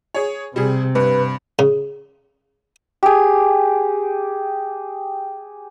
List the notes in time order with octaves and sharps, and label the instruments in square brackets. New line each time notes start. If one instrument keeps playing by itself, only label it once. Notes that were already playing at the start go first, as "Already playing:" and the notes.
[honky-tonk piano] G#4 C#5
[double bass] C3 [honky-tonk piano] G3 G#4
[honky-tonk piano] G2 [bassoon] B4
[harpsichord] C#3
[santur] G4 G#4